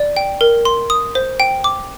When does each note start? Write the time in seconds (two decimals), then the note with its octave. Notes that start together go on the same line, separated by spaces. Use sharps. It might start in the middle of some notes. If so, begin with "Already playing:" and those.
Already playing: D5
0.17 G5
0.41 A#4
0.65 C6
0.90 D#6
1.15 C5
1.40 G5
1.64 D6